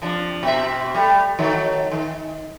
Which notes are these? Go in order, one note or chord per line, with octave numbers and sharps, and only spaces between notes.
C3 F3 D4
B2 C4 E5
G3 A3
D#3 F#3 A3
D#3